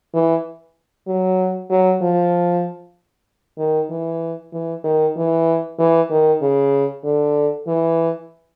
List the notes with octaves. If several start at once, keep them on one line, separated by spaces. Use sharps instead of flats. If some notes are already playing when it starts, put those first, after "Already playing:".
E3
F#3
F#3
F3
D#3
E3
E3
D#3
E3
E3
D#3
C#3
D3
E3